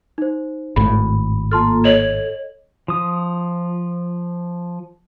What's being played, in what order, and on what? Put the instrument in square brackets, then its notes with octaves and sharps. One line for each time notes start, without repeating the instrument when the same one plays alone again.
[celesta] D#4 C5
[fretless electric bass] G#1 A2 [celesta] B5
[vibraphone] A#3 F4 A4 [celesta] A5 C6 F6
[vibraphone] A4 [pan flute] C#5 [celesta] D#5 F#7
[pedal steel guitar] F3 D#6